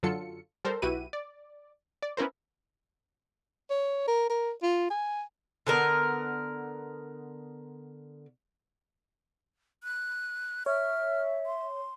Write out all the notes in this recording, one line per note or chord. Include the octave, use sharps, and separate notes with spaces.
F#2 D3 F#3 F4 A4 C#7
G3 A4 A#4 C5
B1 E4 F#4 G4 B4 D#7
D5
D5
B3 C#4 E4 A#4 C5
C#5
A#4
A#4
F4
G#5
D3 B3 A#4
F#6
C#5 E5 F6
C6